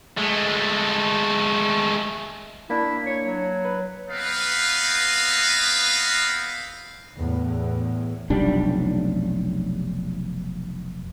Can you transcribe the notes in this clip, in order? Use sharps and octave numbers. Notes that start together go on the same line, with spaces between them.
G#3 A3
A#3 D4 E4
C#5
F#3
B4
B3 C4 B4 D#5 F5
E2 A2
F1 B1 G3 D4